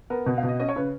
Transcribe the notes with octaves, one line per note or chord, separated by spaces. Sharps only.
B3 A#4
B2 F#4
F5
B2
D#5
C#4 D#5
C#5
C#3 B4